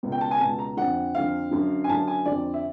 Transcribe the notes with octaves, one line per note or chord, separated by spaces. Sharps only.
C#2 B2
G5
A5
G#5
C#2 B2 A5
A#5
F2 D3 F#5
F2 D3 F5
F#2 D3
G#5
F#2 D3 A5
G#5
F2 D3 D5
E5